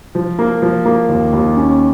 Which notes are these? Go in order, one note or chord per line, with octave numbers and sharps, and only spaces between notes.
F3
A#3
F3
A#3
D#2
D#2
C#4